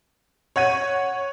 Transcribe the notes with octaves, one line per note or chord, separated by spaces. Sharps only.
C#5 F#5 G#6 D#7